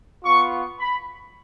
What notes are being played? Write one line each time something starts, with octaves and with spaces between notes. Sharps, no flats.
B3 F4 C#6
B5